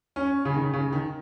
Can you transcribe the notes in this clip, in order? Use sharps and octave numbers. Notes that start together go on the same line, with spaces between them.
C#4
C#3
D#3
C#3
D#3